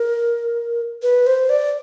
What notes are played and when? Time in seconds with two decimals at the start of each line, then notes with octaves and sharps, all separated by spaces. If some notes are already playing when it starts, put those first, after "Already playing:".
Already playing: A#4
1.02 B4
1.27 C5
1.50 D5